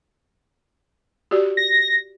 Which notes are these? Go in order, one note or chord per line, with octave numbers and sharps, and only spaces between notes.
F#4 G4 D5
A#6